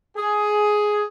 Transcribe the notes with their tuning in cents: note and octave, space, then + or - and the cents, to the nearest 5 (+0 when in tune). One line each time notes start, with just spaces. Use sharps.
G#4 +10